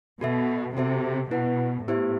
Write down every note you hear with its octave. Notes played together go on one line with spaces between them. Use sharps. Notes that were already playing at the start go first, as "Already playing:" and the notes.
B2 F#4 A4 E5
C3 F#4 A4 C5 E5
B2 E4 B4 F#5
A2 B3 E4 G4 C5 E5